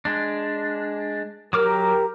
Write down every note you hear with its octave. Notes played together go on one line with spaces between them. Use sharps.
G#3 D4
F#3 G4 A#4 D6 F6